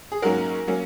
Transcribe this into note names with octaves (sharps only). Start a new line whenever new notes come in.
G#4
G#2 F#3 A#3 C#4 F#4 A#4
F#3 A#3 C#4